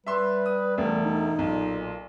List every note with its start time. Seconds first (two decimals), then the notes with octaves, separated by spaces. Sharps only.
0.06 G3 B4 E5 C6
0.46 D#6
0.78 E1 A3
1.05 D#4
1.39 B1 A#2